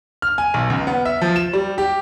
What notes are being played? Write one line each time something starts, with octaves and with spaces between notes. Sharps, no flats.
F6
G#5
B1
C#2
B3
E5
F3
E7
G3
G4